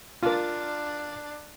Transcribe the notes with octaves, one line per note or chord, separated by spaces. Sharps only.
D4 F4 A#4